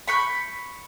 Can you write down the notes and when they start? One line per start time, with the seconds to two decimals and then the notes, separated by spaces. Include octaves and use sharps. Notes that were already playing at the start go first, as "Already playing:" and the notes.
0.08 B5 C#6 G6